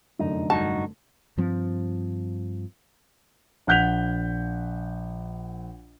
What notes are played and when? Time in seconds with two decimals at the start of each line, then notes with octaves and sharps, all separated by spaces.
0.19 F1 F#2 D3 D#4
0.50 G2 D#4 F#4 A5
1.37 G2 F3 C4
3.67 A#1 F#5 F#6 G6 B6 F7